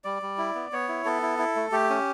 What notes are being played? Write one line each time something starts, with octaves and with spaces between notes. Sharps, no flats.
G3 D5
G3
E4
B3
B3 C#5
E4
B3 A4
E4
E4
A3
A3 G4
C#4